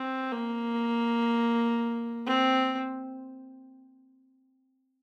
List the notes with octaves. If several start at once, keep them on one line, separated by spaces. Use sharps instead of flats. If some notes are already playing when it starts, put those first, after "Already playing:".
Already playing: C4
A#3
C4